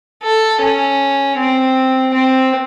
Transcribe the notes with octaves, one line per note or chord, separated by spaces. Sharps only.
A4
C#4
C4
C4